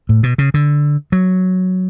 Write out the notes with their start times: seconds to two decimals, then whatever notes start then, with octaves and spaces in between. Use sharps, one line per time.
0.09 A2
0.23 B2
0.38 C#3
0.54 D3
1.12 F#3